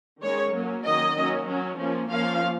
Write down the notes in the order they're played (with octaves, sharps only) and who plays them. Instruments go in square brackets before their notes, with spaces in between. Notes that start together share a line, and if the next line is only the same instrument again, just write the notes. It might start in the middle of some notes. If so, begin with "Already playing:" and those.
[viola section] D#3 G#3 C#4 C#5
F#3 A#3 C#4
D#3 F#3 A#3 C#4 D#5
F#3 A#3 C#4
F#3 C#4
F3 A#3 C#4
F3 A#3 C#4 F5